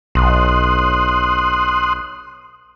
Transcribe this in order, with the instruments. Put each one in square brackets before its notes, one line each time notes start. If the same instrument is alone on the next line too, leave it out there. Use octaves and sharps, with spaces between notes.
[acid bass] B1 [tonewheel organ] C6 D#6 F#6